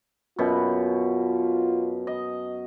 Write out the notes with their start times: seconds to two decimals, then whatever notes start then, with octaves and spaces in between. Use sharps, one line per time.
0.39 F#2 B2 F4
2.07 D#5